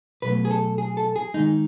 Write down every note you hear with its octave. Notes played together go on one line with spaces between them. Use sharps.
B2 F#3 A3 B4
G#4
A4
G#4
A4
G#4
D#3 G#3 D#4